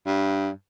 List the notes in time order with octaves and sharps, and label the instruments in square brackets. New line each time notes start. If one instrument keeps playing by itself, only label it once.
[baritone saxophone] G2